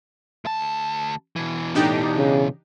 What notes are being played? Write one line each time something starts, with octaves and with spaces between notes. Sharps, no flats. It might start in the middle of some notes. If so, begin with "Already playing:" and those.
D2 A5
B2 E3
A2 D4 D#4 G4
C#3